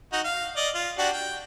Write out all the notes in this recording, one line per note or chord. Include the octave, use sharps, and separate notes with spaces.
D#4 F#4
F5
D5 D#5
F4
D4 F#4 G4
G5